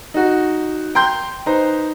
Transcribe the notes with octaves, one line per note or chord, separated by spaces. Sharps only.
D#4 F#4
G5 A#5 C6 G6
D#4 B4 C5 A#5